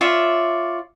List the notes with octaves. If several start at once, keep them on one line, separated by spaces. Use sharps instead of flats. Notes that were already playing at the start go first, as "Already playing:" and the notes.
F4 C#5 D5 E5